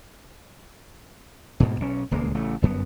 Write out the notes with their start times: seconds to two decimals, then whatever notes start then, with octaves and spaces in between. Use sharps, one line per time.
1.60 D2 G#2 B2
1.80 B1 C#4
2.11 D#1 C#2 G#3 A#3
2.35 A1 C#3 A3
2.62 G1 F#2 B3